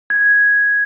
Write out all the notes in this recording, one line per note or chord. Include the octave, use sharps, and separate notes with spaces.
G#6